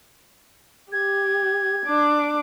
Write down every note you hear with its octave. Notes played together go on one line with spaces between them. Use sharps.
G4 G#6
D4 D6